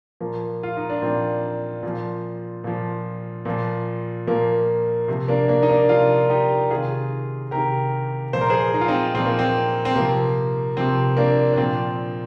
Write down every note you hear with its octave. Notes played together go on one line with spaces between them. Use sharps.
A#2 F3 A#3
F4
D#4
D4
A#2 F3 C4
A#2 F3
A#2 F3
A#2 F3
A#2 F3 A#3
C3 F3
A#3 D4
A#3 D4
D#4
A#3 D4
C3 F3 D4 F4
D#4 G4
C3 D#3 F4 G#4
C3 D#3 G4 A#4
A#2 F3 C5
A#4
G#4 C5
D#4
F4
C4 D#4
A#2 F3 C4
A#3
C4
C4
C3 F3 A#3
C3 F3 C4
A#3 D4
D4
A#2 F3 C4